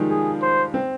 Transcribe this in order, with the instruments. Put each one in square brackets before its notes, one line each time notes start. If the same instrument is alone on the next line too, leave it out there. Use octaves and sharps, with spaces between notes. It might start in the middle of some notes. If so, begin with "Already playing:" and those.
Already playing: [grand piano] D#3 F3 G3 G#3
[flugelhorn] G#4
C5
[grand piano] C4